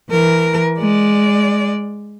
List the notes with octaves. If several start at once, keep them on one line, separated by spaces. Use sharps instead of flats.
E3 A#4
G#3 D5